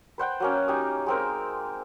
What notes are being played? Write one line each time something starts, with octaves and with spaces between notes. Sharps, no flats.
B4 C5 F#5 G5
F#3 A#3 C#4
D#4 G4 G#5 D#6
G#3 C4 A#4